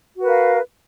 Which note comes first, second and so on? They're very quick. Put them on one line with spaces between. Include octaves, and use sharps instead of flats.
F#4 B4 A#4 F5